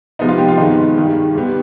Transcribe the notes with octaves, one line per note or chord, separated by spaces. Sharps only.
C3 F3 G#3 B3 D#4
F4
G4
F4
G2 D#3 G#3 B3 D#4
G2 D#3 G3
G#2 G3 B3